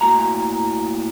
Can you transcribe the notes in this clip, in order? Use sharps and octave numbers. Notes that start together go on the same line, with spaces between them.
A2 A#3 F#4 A#5